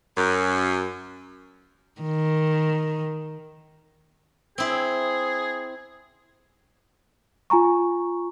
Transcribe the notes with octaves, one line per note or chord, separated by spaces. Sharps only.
F#2
D#3
C4 E4 G#4
F4 G#5 A#5 C#6